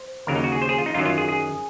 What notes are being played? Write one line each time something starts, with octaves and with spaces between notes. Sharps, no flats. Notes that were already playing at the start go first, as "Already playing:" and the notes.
Already playing: C5
D#2 C#3 F#3 A#4
D#4
F#4
G#4
C5
G#4
F4
D#4
F#2 D#3 F#3 F4
F4
G#4
G#4